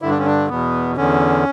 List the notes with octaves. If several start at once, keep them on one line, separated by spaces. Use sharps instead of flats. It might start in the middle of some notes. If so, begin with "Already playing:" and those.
G2 D3 E4
D4
C#4
D4
E2 B2 B3
E2 D3 C#4